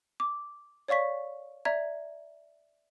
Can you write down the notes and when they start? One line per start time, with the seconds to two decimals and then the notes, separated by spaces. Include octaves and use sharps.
0.20 D6
0.88 C#5 D5 F5 C#6 B6
1.65 D5 E5 A#5 G#6